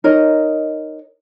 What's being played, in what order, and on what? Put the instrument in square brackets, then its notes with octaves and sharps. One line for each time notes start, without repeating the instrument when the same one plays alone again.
[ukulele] D#4 A#4 C#5 D#5